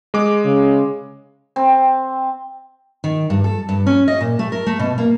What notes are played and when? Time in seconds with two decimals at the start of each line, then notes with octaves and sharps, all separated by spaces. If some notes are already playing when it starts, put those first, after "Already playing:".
0.14 G#3 D6
0.45 C#3
1.56 C4
3.04 D#3
3.30 G2
3.44 A4
3.69 G2
3.86 C#4
4.08 D#5
4.21 A#2
4.39 A3
4.52 A#4
4.66 A3
4.79 B2
4.98 A#3